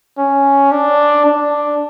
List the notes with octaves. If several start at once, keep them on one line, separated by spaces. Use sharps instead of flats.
C#4
D4
D4